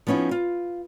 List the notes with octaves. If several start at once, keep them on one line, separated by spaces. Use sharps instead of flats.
F3 B3 C#4 D#4 E4
F4